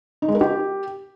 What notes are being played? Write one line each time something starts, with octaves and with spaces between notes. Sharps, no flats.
D#4
G#3
A#4
G4